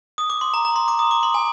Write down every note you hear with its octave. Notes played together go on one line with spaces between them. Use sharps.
D#6
D6
C6
A#5
A#5
C6
D6
D#6
D6
C6
G#5